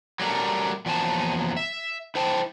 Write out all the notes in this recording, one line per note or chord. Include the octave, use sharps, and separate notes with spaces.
F#3 G3 A3 G#4 A#4
E2 A#2 F3 F#3 G#5 A5
E5
E4 C5 G5 A5